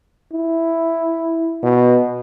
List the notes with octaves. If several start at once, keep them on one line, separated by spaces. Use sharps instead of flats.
E4
B2